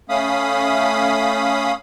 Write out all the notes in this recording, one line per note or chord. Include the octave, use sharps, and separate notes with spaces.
A3 C#4 F5 B5 D#6